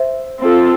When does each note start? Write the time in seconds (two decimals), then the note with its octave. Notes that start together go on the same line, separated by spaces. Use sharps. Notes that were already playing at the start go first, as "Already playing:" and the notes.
Already playing: C5 E5
0.39 C4 F4 A4